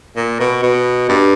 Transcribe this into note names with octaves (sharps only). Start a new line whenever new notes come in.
A#2
B2
B2
G2